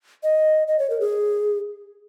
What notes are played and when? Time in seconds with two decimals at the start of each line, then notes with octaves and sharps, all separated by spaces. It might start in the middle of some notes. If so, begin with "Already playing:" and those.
0.23 D#5
0.68 D#5
0.79 C#5
0.90 A#4
1.00 G#4